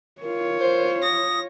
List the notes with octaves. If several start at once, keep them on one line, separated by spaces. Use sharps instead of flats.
F4 A#4 C#5
C5
D#6 A#6